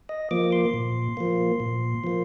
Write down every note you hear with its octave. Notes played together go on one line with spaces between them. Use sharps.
D#5
F3 A#3 D6
C6
A#2
F3 A#3
A#2
F3 A#3